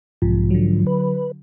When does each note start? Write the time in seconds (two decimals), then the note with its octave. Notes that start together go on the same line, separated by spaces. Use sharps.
0.22 B1 G#2 C3 F3
0.50 D3 F#3
0.87 B4